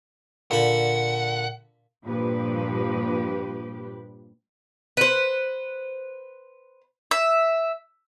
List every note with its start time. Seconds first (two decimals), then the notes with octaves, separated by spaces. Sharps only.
0.51 A#2 D3 F#5 B5
2.05 G2 A#2 F3 G4 B4
4.97 B4 C5
7.11 E5